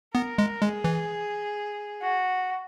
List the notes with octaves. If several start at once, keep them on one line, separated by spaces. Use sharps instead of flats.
B3 A#4
G#3
G#3 G#4
E3
F#4